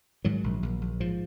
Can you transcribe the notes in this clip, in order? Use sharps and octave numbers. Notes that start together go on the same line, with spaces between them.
G#2 D#3 F#3
A#1
A#1
A#1
G#2 F3